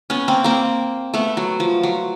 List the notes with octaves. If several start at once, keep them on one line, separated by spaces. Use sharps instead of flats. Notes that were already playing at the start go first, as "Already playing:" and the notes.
B3 C#4
A#3 C4
A#3 C4
A3 B3
F#3
F3
F#3